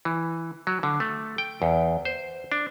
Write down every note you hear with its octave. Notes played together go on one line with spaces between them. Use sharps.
E3
F#3
D3
A3
G5
E2
C5
D4